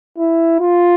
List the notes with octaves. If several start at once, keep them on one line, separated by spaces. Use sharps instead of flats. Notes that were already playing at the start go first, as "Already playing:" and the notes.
E4
F4